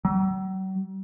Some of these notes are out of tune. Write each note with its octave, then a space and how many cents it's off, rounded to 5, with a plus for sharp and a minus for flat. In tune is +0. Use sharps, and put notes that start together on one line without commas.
F#3 +45